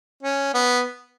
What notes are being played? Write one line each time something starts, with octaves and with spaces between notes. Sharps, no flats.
C#4
B3